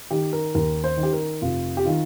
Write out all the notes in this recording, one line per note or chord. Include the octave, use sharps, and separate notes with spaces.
D#3 G4
A#4
D#2 A#4
C5
D#3
G4
A#4
F1 F4
G4
D#3 F4